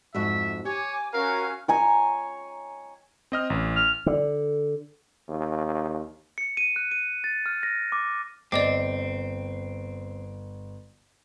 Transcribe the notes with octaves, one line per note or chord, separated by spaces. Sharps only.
F2 G#2 F#4 E5
G4 C#5 G#5 D6
C#4 F#4 A#4 F5
C#5 G#5 A#5
C4 D#5 F6
A1
F6
D3
D#2
C#7
D#7
F#6
D#7
A6
F6
A#6
D6
G1 C4 D5 D#5 D6